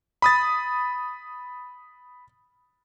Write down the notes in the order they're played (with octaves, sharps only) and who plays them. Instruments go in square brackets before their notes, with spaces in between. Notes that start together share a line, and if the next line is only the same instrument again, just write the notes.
[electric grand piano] B5 D#6 A6